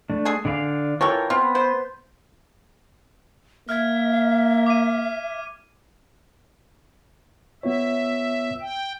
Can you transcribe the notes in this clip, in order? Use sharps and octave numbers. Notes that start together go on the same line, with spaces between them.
A3 D4
G#4 A4 G#5
D3 D5 F5
E3 F4 A4 A#4 C#5 G5
B3 C4 F4 B4
C5
A#3 E5 F6 G#6
D6 D#7
B3 F4 C#5 E5
G5